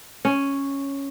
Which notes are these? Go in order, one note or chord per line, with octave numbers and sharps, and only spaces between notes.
C#4